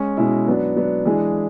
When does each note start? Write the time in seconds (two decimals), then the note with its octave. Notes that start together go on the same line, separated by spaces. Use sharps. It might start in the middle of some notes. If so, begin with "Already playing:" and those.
Already playing: G#3 C#4
0.17 B2 G#3 C#4 E4
0.48 F#3 B3 D4
0.76 F#3 B3 D4
1.05 E3 G#3 D4 G#4